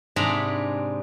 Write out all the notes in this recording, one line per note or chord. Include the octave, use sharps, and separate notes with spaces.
G#2 C3 D4 G#4 A#5 B5